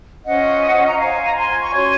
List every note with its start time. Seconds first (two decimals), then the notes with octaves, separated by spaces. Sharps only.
0.25 C#4 F4 C5 D#5 F#5
0.86 A#5
0.98 F4 C5 F5 G#5
1.25 A#5
1.35 G#5 C6
1.61 C#6
1.71 C#4 F#4 C#5 G#5 C6